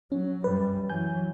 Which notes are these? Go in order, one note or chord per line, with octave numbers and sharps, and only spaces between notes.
F#3 C#4
F#2 G3 B4
E3 F#3 G#5 G6